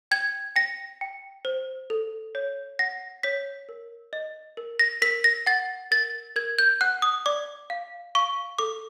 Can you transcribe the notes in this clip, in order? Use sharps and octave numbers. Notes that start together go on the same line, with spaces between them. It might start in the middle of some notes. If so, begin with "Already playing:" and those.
G5 G#6
G5 A#6
G5
C5
A4
C#5
F#5 A#6
C#5 B6
A#4
D#5
A#4
A#6
A#4 B6
A#6
F#5 A6
A#4 A6
A#4 G#6
G6
F#5 F#6
D#6
D5 D6
F5
F5 C#6
A4 D6